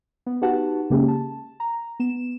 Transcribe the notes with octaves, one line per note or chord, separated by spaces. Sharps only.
B3
D#4 F#4 G4 B4 F#5 A5
C#3 G#3 A#3 C#4 G4 G#4
A5
A#5
B3 E7